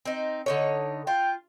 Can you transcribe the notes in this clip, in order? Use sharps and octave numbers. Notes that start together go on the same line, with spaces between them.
C4 D#4
D3 D#4 C#5
F4 G5